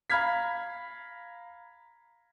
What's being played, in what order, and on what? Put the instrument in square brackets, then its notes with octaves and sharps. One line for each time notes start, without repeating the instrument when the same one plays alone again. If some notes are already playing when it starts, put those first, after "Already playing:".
[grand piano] F5 A#5 B5 F6 G#6 B6